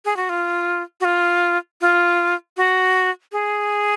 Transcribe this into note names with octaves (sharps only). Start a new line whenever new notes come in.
G#4
F#4
F4
F#4
F4
F4
F#4
G#4